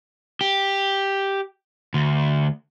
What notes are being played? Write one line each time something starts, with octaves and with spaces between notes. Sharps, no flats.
G4
D2